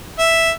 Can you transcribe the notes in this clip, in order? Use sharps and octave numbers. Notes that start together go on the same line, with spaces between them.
E5